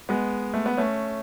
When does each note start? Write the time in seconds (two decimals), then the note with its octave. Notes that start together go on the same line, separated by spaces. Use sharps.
0.09 G#3 B3
0.54 A3
0.66 B3
0.77 A3 C#4